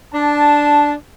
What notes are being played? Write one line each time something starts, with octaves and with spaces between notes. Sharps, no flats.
D4 A5